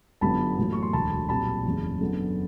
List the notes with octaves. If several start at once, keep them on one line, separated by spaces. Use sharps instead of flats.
G1 F#2 D3 F#3 B3 A5 B5
A1 A2 F#3 A#3
C#6
C6
E1 D2 D3 A5 B5
B1 A#2 G3 C4 A5 B5
F#1 E2 C#3
F#2 D3 F#3 B3